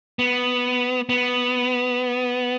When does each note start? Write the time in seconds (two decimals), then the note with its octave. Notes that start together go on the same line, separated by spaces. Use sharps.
0.19 B3
1.09 B3